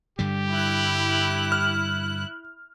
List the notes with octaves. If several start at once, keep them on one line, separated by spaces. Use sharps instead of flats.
G2 D3 G3 G4
E4 F#6
F6